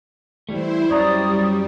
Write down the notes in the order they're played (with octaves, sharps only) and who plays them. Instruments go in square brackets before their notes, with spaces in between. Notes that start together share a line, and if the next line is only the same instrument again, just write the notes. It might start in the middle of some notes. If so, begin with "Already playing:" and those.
[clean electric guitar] E3 G3 A3 [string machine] E4 C5
[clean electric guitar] F#2 C#5 A#5 [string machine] G3 [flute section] D5 D#6